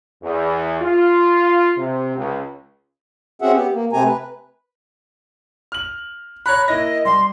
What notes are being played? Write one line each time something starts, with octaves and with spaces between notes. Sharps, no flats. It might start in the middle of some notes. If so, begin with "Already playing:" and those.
E2
F4
C3
C#2
C4 C#4 F#4 G#4 E5 F#5
B3 G4
A#3
C3 A3 C4 G4 G#5 A#5
B4
F6 F#7
C#5 A#5 B5 F#6
A#3 E4 D#5 A#6
G3 C6